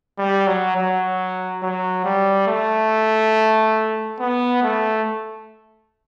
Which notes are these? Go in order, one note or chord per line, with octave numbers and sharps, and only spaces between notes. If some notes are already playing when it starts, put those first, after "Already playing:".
G3
F#3
F#3
F#3
G3
A3
B3
A3